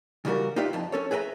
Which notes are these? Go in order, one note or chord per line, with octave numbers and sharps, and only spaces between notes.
C#3 E3 G3 F#4 A#4
D#4 F4 G4 B4 D5 E5
F2 A5
C#4 A4 C#5
G#4 B4 E5 G5 A#5